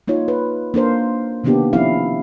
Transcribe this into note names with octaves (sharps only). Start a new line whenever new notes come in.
A#3 D#4 F4 C#5
B4
A#3 D4 A#4 C5
C3 D#3 A#3 B3 D4 G4
F3 C4 C#4 E4 F5